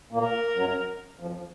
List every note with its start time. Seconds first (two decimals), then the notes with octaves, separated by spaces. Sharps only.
0.12 A#2 A#3
0.23 A#4
0.56 F#2 F#3
1.20 F2 F3